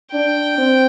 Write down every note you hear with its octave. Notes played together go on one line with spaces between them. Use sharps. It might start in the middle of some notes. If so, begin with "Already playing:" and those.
D4 G5
C4